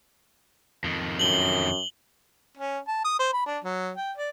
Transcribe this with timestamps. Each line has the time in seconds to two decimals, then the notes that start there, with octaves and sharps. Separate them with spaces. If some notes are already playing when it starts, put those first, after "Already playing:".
0.84 F2 D#3
1.19 F#2 F#7 G7
2.57 C#4
2.88 A5
3.05 D#6
3.19 C5
3.33 B5
3.46 D4
3.64 F#3
3.97 G5
4.17 D5